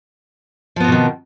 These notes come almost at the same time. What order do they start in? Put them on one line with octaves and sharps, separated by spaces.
F3 B3 C4 B2 D#3